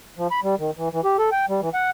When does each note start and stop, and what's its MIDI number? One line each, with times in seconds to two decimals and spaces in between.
0.18 0.27 53
0.31 0.40 83
0.43 0.55 55
0.59 0.71 51
0.78 0.89 52
0.93 1.01 52
1.04 1.17 67
1.19 1.30 69
1.32 1.46 79
1.49 1.61 55
1.62 1.69 52
1.74 1.90 78